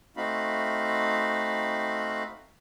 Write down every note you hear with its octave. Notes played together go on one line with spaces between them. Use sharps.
A3 C4 D#4 F#4 F5 B5